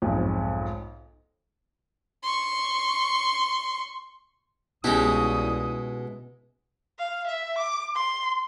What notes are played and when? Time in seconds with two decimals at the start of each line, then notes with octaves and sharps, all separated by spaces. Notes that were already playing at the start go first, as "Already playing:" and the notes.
0.02 B1 F2 G#2
2.24 C6 C#6
4.84 C2 B2 G#3 C#4 D#4 E4 G4 D#6
6.99 F5
7.27 E5
7.58 D6
7.95 C6